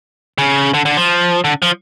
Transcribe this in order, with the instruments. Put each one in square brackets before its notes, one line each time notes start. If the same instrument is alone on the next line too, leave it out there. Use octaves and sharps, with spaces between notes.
[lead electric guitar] C#3
D3
D3
F3
D3
F3